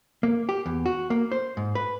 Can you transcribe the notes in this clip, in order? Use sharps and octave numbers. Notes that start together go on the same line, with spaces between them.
A#3
G4
E2
F#4
A#3
C5
G#2
B4